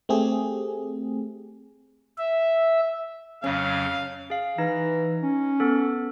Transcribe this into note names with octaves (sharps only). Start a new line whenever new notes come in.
A3 C4 G4 G#4
E5
F2 C#3 F#3 C#4 F5
G#4 F5
E3 D#4 A#6
C#4
B3 A4